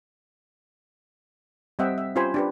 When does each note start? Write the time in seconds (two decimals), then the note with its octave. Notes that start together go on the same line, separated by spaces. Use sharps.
1.79 G3 C4 D#5 E5 F#5 G5
1.98 E5
2.16 C#4 F4 G4 C5 G#5 B5
2.34 D4 G4 B4